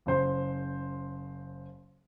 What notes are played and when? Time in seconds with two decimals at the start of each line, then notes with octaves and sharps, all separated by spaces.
0.06 F#1 C#3 C5 C6